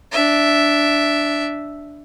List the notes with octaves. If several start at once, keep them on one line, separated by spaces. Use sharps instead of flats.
D4 E5